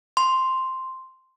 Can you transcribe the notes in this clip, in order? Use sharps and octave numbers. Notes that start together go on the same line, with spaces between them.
C6